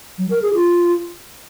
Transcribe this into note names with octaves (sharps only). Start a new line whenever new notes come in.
F#3
A#4
G#4
F4